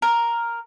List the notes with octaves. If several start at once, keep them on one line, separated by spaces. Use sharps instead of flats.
A#4